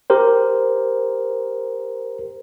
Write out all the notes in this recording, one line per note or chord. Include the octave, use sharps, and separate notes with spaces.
G4 A#4 C5